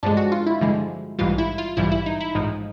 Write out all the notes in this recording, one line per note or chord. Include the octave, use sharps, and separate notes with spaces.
G2 D3 F3 G#3 D4
F#4
F4
E4
G2 D3 F3 G#3
A#1 G#2 E3 G3 F4
E4
F4
A#1 G#2 E3 G3 E4
E4
D#4
E4
A1 G#2 F3 D#4